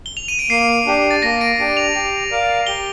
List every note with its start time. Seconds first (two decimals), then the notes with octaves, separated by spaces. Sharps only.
0.06 G7
0.17 F7
0.28 D#7
0.39 D7
0.50 A#3 C7
0.86 D4 G4
1.11 A6
1.22 A#3 A#6
1.41 D7
1.59 D4 G4
1.77 F7
1.95 G4
2.31 A#4 D5 F5
2.67 G4 G7